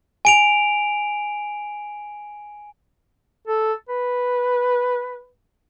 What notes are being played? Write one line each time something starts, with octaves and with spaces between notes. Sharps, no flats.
G#5 D7 F7
A4
B4